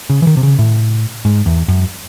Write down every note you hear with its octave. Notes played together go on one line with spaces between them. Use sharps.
C#3
E3
D#3
C3
C#3
A2
G#2
E2
F#2